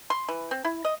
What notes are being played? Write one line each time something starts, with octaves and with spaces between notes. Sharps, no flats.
C6
E3
C4
E4
D#5